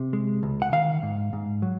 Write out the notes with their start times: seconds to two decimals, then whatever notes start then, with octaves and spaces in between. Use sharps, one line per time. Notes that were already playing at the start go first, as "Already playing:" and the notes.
Already playing: C3
0.13 G#3
0.43 C#2
0.62 F#5
0.72 D#3 F5
1.03 G#2
1.33 G#2
1.62 F#3